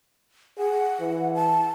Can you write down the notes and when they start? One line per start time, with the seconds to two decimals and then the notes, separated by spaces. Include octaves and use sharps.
0.58 G#4 F#5
1.00 E3
1.35 A5